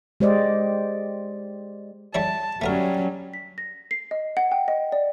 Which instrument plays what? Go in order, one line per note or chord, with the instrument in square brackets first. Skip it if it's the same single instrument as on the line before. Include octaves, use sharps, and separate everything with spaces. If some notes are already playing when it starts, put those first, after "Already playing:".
[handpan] G#3 G4 C5 D5 D#5
[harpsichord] G3 E4 C#5 [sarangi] A5
[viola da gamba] F#3 C#4 [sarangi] G3 [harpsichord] A3 B3 A#4
[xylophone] B6
A#6
C7
D#5
F#5
G5
D#5
D5